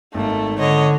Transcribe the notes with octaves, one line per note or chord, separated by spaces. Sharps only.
G#1 A3 A#3
D3 C#5 D#5